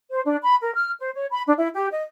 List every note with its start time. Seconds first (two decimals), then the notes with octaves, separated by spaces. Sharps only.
0.11 C5
0.25 D4
0.43 B5
0.62 A#4
0.75 F6
1.00 C5
1.14 C#5
1.31 B5
1.46 D4
1.57 E4
1.75 G4
1.91 D#5